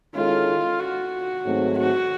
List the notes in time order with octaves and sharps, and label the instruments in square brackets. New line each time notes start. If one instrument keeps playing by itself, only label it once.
[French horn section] D#3 G#3 C#4 E4 A4 [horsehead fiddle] F4
[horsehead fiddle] F#4
[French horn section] G#2 D#3 F#3 A3 C4
[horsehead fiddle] F#4